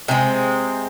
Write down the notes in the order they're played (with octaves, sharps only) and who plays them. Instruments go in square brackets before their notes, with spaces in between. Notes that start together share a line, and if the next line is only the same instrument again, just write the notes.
[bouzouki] C3 G#3 C4